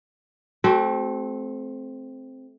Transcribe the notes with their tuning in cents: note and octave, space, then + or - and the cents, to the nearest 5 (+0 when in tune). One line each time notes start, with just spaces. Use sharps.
A3 -30 C4 +0 F#4 +20